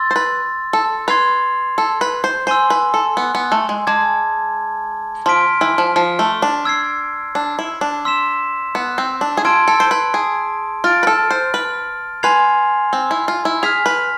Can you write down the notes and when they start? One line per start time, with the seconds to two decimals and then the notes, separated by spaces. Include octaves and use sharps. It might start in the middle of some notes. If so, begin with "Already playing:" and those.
Already playing: C6 E6 A6
0.11 C5
0.16 B4
0.73 A4
1.08 B4 C6 G#6 C7 F7
1.78 A4
2.01 B4
2.24 C5
2.47 C5 G#5 C6 E6
2.70 B4
2.94 A4
3.17 B3
3.35 B3
3.52 A3
3.69 G#3
3.87 G#3 A5 D6 G#6
5.26 F3 C6 F6 B6 D7
5.61 E3
5.78 F3
5.96 F3
6.19 A3
6.42 D4
6.65 E6 G#6 C7
7.35 D4
7.59 E4
7.81 D4
8.05 C6 E6 B6 E7
8.75 B3
8.98 C4
9.21 D4
9.37 G#4
9.45 F4 A5 C6 E6 G#6 D7
9.68 A4
9.80 C5
9.91 B4
10.14 G#4
10.84 F4 F6 A6 D7
11.03 B4
11.07 A4
11.30 C5
11.54 B4
12.23 B4 G#5 C6 G#6 C7 F7
12.93 C4
13.11 E4
13.28 F4
13.45 E4
13.63 G#4 F6 B6 F7
13.86 B4